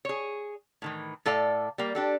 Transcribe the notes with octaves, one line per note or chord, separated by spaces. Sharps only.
G#4 C#5
A2 D#3 E3
A2 A4 D5 F5
G3 A#3
D4 G4 A4